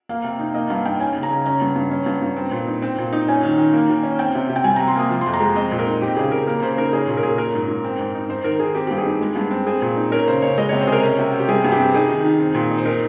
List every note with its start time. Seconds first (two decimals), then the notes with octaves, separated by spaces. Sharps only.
0.09 A#3 F5
0.24 C3
0.39 D#4
0.54 A#3 D#5
0.70 G2 F5
0.85 D#4 G5
1.00 C#4 G#5
1.15 C#3
1.23 A#5
1.31 C#3
1.46 C#4 A#5
1.61 G2
1.76 G2
1.91 C#4
2.06 G2
2.22 G2
2.37 C4
2.51 A#2
2.67 D#4
2.82 C4
2.98 A#2
3.13 D#4
3.28 C#4 G#5
3.43 D#3
3.58 D#3
3.73 A#3
3.89 D#3
4.03 C#4
4.19 C4 G5
4.35 C3
4.50 C3
4.56 G5
4.64 G3 G#5
4.76 C3 A#5
4.88 C6
4.96 A#3 D#6
5.10 F3
5.21 F2 C6
5.34 A#5
5.40 G#3
5.56 C4 D#5
5.71 A#2
5.79 A#4
5.86 D#4
6.02 C4 G4
6.17 C#3 G#4
6.31 C#3 A#4
6.47 A#3 A#4
6.62 C#3 C5
6.77 D#4 A#4
6.93 C#4 G#4
7.08 A#2
7.17 A#4
7.23 A#2 G#4
7.38 C#4 A#4
7.54 G#2
7.68 G#2
7.84 C4
8.00 G#2
8.15 D#4
8.30 D#4 C5
8.44 D#3 A#4
8.60 D#3 G#4
8.75 C4 G4
8.87 G2 G4
8.98 G#4
9.06 D#4
9.21 G#3
9.36 G2
9.51 C4
9.66 C4 G#4
9.82 A#2
9.96 D#4
10.12 C#4 A#4
10.27 C#3 C5
10.42 C#3 C#5
10.58 G#3 D#5
10.69 C3 C#5
10.81 C5
10.87 C4 G#4 A#4
11.04 C#4
11.19 C3
11.34 C3
11.40 G4
11.49 G3 G#4
11.64 G2
11.72 G4
11.80 C4
11.94 D#4 G#4
12.10 D#3
12.25 D#3
12.40 C4
12.55 A#2
12.70 D#4
12.78 C5
12.85 D#4 A#4